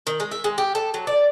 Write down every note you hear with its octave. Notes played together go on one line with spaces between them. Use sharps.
D#3
G#3
E5
G#3
G4
A4
F#3
D5